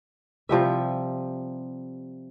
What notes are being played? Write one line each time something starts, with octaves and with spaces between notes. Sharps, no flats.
C3 F3 G3 E5